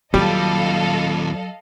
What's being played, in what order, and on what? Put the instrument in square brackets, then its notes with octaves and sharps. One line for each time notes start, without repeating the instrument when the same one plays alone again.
[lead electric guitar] D#2 F4 [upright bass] F#3 [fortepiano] G3 [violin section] A4 D#5 F5